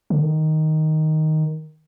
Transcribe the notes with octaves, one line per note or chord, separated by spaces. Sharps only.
D3
D#3